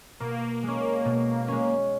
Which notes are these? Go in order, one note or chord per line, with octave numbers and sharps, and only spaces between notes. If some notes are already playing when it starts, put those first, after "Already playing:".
B2 A#3
G#3 C#4
B2
G#3 C#4